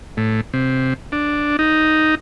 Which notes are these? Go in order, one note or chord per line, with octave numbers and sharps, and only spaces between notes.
A2
C3
D4
D#4